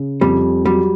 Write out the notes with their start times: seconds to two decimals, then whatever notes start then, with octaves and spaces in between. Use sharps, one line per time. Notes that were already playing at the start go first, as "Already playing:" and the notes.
Already playing: C#3
0.21 F2 G3
0.65 F#3 G3